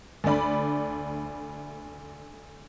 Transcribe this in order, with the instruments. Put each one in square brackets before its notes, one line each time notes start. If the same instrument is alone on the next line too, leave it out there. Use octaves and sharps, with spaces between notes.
[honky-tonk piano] D2 A3 D4 D5 B5